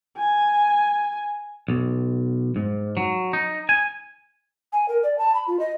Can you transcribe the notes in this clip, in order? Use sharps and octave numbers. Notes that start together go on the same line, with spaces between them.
G#5
B1
G#2
F#3
D#4
G#5
G#5
A#4
D5
A5
B5
F4
D#5